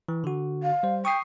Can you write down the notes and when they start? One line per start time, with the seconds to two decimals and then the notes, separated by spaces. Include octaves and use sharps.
0.09 E3
0.24 D3 F#4
0.63 F5
0.83 G3 C5
1.05 G5 C#6 D#6 C7